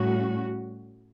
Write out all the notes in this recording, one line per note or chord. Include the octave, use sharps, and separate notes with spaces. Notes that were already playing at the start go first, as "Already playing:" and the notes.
Already playing: A2 G3 C#4 F#4